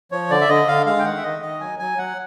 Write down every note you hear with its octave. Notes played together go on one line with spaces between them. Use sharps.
F3 C#5
D3 D5
E5
D3 D#5
D3 F5
G#3 F5
G5
D#3 F#5
E5
D#3 D#5
D#3 D#5
F#3 G#5
F#3 G#5
F#3 F#5